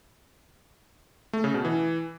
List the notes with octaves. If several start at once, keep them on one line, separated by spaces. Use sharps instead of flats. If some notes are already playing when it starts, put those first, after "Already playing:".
A3
C#3
B2
E3